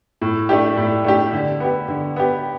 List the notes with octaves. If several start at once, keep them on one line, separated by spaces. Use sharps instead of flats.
A2
A3 D4 G4
A2
A3 D4 G4
D3
B3 G4
D3
B3 G4